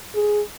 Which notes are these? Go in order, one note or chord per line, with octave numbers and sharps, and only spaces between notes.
G#4